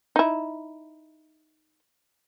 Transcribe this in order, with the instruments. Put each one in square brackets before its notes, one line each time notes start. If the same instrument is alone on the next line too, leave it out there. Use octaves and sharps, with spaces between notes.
[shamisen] D#4 E4